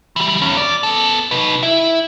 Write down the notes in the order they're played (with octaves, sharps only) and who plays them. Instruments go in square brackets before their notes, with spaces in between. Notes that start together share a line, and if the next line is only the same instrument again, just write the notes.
[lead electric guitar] E3 G3
E2 C#4
D5
B3 A4
D#4 B4
E4